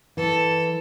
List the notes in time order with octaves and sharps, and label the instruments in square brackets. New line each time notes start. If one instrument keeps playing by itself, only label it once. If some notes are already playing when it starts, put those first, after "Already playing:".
[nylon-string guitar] E3 [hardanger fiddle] A4